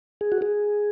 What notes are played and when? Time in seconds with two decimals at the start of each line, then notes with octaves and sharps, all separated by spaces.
0.21 G#4
0.32 F#4
0.42 G#4